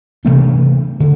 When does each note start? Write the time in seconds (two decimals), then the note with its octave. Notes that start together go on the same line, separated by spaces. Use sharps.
0.25 C3 E3 A3 D4
1.00 D3